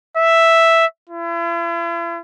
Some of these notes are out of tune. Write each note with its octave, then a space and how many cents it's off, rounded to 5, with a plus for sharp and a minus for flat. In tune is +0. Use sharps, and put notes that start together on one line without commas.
E5 +0
E4 +45